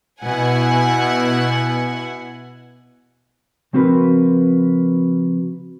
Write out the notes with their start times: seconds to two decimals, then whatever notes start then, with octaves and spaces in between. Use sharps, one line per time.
0.21 B2 E4 F#5 G#5
3.73 C#3 F3 C4 F#4 A#4 B4